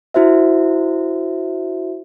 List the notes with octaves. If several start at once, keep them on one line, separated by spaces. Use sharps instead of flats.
E4 F#4 C5 E5